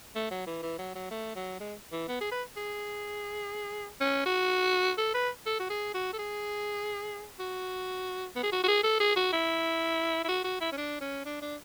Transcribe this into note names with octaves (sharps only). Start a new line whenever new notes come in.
A3
F#3
E3
E3
F#3
F#3
A3
F#3
G#3
E3
B3
G#4
B4
G#4
C#4
F#4
A4
B4
A4
F#4
G#4
F#4
A4
G#4
F#4
B3
G#4
F#4
F#4
G#4
A4
G#4
F#4
E4
E4
F#4
F#4
E4
C#4
D4
C#4
D4
D4